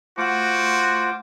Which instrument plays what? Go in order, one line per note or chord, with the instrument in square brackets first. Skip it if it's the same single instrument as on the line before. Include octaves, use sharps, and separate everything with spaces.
[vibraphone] A3 F#5 [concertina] F4 C5 D6 [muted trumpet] F#4